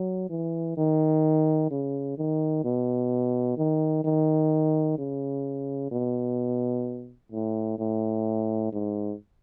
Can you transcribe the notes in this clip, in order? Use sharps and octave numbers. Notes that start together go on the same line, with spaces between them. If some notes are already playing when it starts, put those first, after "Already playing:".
Already playing: F#3
E3
D#3
C#3
D#3
B2
D#3
D#3
C#3
B2
A2
A2
G#2